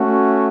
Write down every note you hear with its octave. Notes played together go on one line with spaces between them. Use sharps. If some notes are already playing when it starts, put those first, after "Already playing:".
Already playing: A3 C#4 F#4